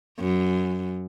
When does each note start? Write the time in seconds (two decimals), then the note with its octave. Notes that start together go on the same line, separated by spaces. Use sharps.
0.19 F#2